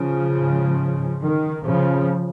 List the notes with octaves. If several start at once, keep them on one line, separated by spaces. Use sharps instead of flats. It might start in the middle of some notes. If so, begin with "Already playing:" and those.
Already playing: C#3 F3
G#2
D#3
C#3 F3